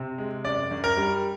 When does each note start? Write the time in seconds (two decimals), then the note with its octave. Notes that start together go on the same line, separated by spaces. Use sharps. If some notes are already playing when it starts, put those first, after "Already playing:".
Already playing: C3 C4
0.18 G#3
0.45 F#2 D5
0.71 F#2
0.84 A#4
0.97 G3